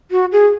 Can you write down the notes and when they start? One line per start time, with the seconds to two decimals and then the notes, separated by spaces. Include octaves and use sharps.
0.11 F#4
0.32 G#4